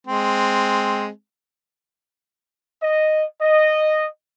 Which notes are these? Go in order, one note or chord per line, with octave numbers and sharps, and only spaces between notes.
G#3 C4
D#5
D#5